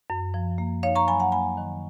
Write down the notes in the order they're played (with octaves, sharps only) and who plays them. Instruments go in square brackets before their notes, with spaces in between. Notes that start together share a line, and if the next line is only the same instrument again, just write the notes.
[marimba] F#2
F3
A#3
D#4 C#5 F5
A#5 C#6
F#3 G#5 B5
F#5 A#5
A#3 G#5 B5
D#3